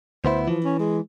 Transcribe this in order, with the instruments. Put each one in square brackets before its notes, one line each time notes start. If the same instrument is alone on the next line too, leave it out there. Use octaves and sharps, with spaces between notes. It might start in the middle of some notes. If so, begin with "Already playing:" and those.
[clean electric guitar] D2 B3 E4 [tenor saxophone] C5
[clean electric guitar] E3 [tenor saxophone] F3
[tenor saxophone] C#4
G#3